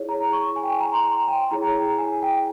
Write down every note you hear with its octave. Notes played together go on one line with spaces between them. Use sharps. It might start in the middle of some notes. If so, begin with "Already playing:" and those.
Already playing: E4 G#4 C#5
A#5
C#6
G#5
G5
G#5
A#5
C6
A#5
G5
E4 G#4 C#5 A#5
A#5
G#5
G5